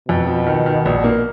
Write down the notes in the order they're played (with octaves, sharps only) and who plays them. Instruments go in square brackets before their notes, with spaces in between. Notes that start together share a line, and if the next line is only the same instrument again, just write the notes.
[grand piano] F2 [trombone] B2
[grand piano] F3
D#3
D#3
A#1
A#3